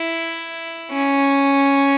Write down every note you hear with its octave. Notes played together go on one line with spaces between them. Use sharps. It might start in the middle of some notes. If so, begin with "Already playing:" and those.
Already playing: E4
C#4